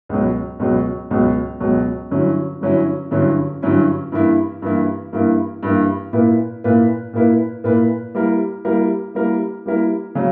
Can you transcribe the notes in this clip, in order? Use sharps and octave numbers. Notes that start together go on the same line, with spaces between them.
C#2 B2 F#3
C#2 B2 F#3
C#2 B2 F#3
C#2 B2 F#3
G2 D3 F#3 C#4 E4
G2 D3 F#3 C#4 E4
G2 D3 F#3 C#4 E4
G2 D3 F#3 C#4 E4
G2 E3 A#3 E4
G2 E3 A#3 E4
G2 E3 A#3 E4
G2 E3 A#3 E4
A#2 A#3 E4 B4
A#2 A#3 E4 B4
A#2 A#3 E4 B4
A#2 A#3 E4 B4
G3 A#3 E4 A#4
G3 A#3 E4 A#4
G3 A#3 E4 A#4
G3 A#3 E4 A#4
C#3 F#3 C#4